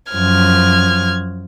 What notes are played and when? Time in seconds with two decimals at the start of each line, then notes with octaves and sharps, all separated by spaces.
0.13 F#2 F3 F6 G#6